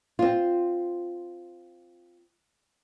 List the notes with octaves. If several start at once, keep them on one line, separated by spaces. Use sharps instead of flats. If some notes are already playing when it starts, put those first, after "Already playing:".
C4 F4